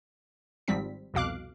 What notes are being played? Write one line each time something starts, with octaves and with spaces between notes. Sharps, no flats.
G#1 G#2 F3 G3 C4 B6
C2 F2 B2 F5 D6 F#6